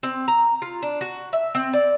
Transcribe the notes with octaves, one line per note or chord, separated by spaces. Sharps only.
C4
A#5
F4
D4
F#4
E5
C4
D5